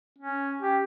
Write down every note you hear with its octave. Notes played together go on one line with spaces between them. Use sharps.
C#4
G4